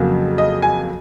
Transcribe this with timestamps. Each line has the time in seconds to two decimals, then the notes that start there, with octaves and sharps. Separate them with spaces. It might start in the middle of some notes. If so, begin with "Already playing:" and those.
Already playing: F2 C#3 F#3 A#3
0.38 D#5
0.62 G#5